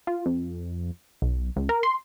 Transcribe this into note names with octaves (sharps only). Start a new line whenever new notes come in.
F4
F2
B1
C#2
A#4
C6